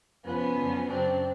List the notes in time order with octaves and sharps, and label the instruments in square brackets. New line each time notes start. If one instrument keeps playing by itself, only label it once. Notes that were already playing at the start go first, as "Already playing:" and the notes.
[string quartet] F2 C3 F3 B3 C#4
F#2 D3 F3
F#2 C#3 F#3 C4 D4